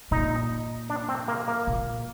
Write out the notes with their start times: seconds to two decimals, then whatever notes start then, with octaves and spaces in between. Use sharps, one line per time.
0.11 A#2 D#4
0.90 D4
1.09 C4
1.28 A#3
1.48 A#3
1.67 A#2